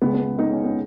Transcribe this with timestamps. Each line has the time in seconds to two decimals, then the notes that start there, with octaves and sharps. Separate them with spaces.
0.02 C#2 C#3 G#3 B3
0.14 B3
0.39 B3 D#4
0.51 C#4
0.64 B3